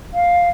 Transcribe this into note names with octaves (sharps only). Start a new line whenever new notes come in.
F5